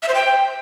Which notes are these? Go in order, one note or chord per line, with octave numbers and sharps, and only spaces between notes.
E5
C5
G5